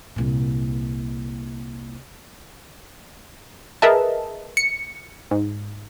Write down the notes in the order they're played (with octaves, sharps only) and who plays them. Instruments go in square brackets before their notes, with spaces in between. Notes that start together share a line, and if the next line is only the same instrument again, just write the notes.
[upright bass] C2 A#2
[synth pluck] G#4 A#4 B4 D#5 E5 A5
C#7
G#2